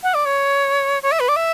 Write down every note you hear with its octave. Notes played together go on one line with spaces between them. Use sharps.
F#5
D5
C#5
C#5
E5
B4
D5
E5